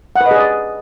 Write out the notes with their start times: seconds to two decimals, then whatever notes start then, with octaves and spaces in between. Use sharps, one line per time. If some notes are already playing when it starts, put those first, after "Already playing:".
0.16 F#5
0.21 B4
0.26 D#5
0.31 G#4
0.36 D5